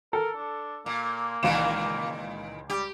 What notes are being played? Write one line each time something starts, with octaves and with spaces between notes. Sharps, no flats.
A4 A#4
D4
A#2 A#3
C#2 A#2 D#3 E3 F5 E7
G3 G4